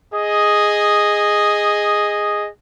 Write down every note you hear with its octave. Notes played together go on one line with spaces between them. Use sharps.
G#4 D#5